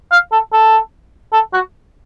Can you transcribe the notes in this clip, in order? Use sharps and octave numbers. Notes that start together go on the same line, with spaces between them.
F5
A4
A4
A4
F#4